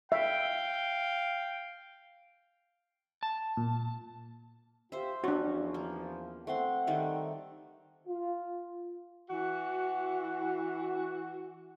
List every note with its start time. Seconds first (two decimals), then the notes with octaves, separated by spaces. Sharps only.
0.12 E5 F5 G5
3.23 A5
3.57 A#2
4.92 F4 G4 C5 E5
5.24 E2 F3 C#4 D4 F#4
5.74 A#3
6.47 A3 C4 F#5 C6
6.87 D#3 G3 A3
8.07 F4
9.30 E3 F#4